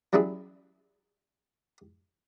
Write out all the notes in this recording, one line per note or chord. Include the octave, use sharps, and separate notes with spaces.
F#3 G3 C#4 E4 G#4